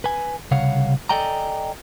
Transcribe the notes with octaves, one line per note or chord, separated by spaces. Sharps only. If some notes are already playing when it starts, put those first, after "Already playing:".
B4 G#5
C2 C#3 C#5 F5 F#5
A4 D5 D#5 G5 G#5 A#5